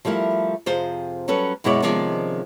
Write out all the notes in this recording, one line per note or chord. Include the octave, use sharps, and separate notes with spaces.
F3 G3 A3 E4 A#4
F2 C3 F4 G#4 C5
F#3 G3 C#4 A4 B4
F#2 B2 G#3 E4 C#5 D5
C3 D#3 F3 G#3 C#4 D5